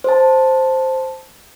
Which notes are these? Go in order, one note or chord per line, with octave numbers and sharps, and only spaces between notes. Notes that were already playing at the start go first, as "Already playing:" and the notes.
C5 A5